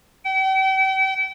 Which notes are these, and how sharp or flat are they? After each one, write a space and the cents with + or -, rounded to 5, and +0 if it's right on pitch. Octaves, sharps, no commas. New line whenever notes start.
G5 -40